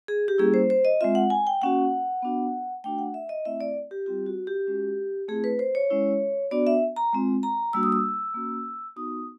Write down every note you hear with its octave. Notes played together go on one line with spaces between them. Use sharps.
G#4
G4
G3 A#3 C#4 E4 G#4
C5
C5
D#5
G#3 C4 F4 E5
F#5
G#5
G5
A#3 C#4 F#4 F#5
B3 D4 F#4
A3 D4 F#4 G5
F#5
E5
D#5
A3 C4 E4 E5
D5
G4
G3 C4 F4 G4
F#4
G4
G#3 C#4 F#4
A3 C4 E4 G#4
B4
C5
C#5
G#3 C#4 E4
B3 D4 F#4 D5
E5
A#5
G#3 C4 F4
A#5
G3 A#3 D4 F#4 E6
D#6
E6
A#3 C#4 F#4
B3 D#4 F#4 D#6